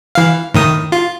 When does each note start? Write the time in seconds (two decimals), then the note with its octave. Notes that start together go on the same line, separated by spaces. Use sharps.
0.15 E3 F5
0.54 A2 D#3 D#6
0.92 F4